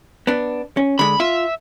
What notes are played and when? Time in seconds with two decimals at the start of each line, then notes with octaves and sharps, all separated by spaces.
0.27 B3 D4
0.77 C#4
0.99 D3 G#3 B5
1.20 F4 E5